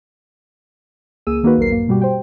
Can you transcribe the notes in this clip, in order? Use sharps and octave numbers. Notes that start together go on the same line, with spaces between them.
C#2 A#3 G#4 E6 D#7
D#3 A#3 D#4 F#4 B4
A#1 D#2 F#3 A#4 C7
G2 A#3
B2 G3 F#4 G4
C5 G5